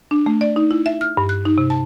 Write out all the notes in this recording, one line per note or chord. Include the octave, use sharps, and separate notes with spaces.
D4
A3
D5
D#4
E4
E5
F6
G2
F#6
D#4
C3
A5